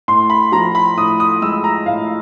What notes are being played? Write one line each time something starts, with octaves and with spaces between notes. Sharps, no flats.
A2 C6
B5
F3 A#5
B5
A2 D#6
D#6
G#3 E6
A#5
A2 F5